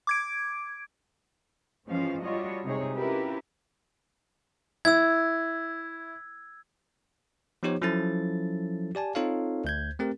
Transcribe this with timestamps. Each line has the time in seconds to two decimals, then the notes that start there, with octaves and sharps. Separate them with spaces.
0.07 D6 G#6 D7
1.86 G#2 E3 F3 C#4 F5
2.22 G3 D4 F4 F#4 C#5 D#5
2.64 C3 G#3 D#4 G#4 C#5
2.95 C#4 E4 F4 G4 A#4 B4
4.85 E4 E6 G#6
7.63 F3 B3 D#4 G4 C5 C#5
7.81 F3 F#3 C#4 E4 A4 A6
8.95 G4 D5 G#5 A5
9.15 C4 D#4 F4 A4 C#5 F5
9.64 D2 G6 G#6
9.99 A3 C4 G4 A#4